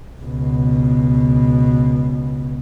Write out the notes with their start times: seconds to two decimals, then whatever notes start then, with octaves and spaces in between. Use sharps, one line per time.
0.21 C#2 B2